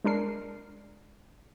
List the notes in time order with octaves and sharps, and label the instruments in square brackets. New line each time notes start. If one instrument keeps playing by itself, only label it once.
[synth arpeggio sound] G#3 D4 A#4 C7